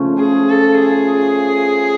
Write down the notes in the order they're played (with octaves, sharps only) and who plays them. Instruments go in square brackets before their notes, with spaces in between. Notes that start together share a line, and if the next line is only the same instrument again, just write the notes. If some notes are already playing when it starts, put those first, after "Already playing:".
Already playing: [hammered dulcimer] C#3 F3 A3 C#4
[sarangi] G#4
A4
G#4